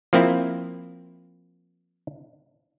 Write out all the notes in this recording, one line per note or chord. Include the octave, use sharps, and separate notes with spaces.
F3 A#3 C4 E4